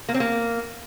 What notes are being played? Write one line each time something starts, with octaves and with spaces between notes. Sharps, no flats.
A#3
C4
A#3